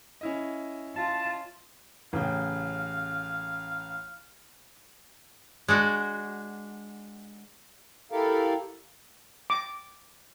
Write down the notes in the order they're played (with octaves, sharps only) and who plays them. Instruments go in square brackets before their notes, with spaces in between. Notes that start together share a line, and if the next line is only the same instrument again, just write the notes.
[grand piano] C#4 E4 D#5
[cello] F4 [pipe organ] A5
[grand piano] A1 C#3 G5 [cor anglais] F5
[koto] G#3 D4 F#4
[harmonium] E4 G4 A4 A#4 F5
[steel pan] D6